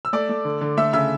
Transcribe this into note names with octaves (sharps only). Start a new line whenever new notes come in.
E6
A3 D5 D6
A3
D3
D3
A3 E5 E6
C#3 E5 E6